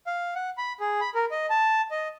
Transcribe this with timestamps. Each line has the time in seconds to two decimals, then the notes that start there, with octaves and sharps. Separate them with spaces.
0.07 F5
0.35 F#5
0.58 B5
0.80 G#4
1.01 B5
1.15 A#4
1.31 D#5
1.50 A5
1.91 D#5